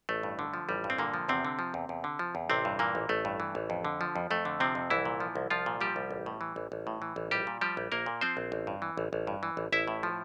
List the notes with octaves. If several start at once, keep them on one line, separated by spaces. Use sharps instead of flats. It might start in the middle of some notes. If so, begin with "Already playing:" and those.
A1 A3
G2
D3
F3
A1 G3
G2
C4
A#2 D3 A#3
F3
E2 C3 C4
D3
F3
E2
E2
D3
F3
E2
A1 C3 C4
G2
A#2 E3 A#3
A1
A1 A3
G2
E3
A1
F2
D3
F3
F2
F2 A3
D3
C3 F3 C4
F2
C2 E3 E4
A#2
F3
C2
C2 F3 F4
A#2
F3 G3 G4
C2
A1
A2
E3
A1
A1
A2
E3
A1
A#1 G3 G4
A#2
F3 G3 G4
A#1
A#1 A#3 A#4
A#2
F3 C4 C5
A#1
A1
G2
E3
A1
A1
G2
E3
A1
A1 E4 E5
A2
F3